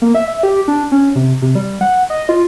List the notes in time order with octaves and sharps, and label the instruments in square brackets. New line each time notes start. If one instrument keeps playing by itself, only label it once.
[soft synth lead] A#3
E5
E5
G4
D4
C#4
C3
C3
G3
F#5
D#5
F4